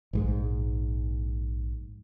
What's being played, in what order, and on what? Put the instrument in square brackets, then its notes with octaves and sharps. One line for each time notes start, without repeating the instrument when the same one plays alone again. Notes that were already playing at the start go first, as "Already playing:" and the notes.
[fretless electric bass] A#1 G#2 G#3